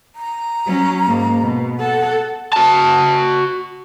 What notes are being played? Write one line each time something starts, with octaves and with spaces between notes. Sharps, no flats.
A#5
F#3 C#4
G#2 A#3
B2
A4 F#5
F#4 A5